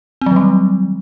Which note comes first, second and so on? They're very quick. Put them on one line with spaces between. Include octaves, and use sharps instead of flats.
C4 F#3 D#3 G3